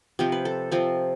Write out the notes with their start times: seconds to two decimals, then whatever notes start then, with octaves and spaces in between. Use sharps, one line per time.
0.19 C3 F3 C4 G4
0.32 B4
0.45 A4
0.71 C3 F3 C4